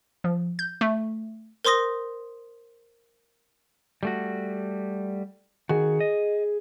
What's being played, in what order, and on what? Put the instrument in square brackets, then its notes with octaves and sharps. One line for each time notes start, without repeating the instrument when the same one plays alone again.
[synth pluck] F3
G6
A3
[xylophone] A#4 C5 C6 D#6 A#6
[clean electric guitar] G3 A3 F#4
[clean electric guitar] D#3 F#4 [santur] G#4
[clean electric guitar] D#5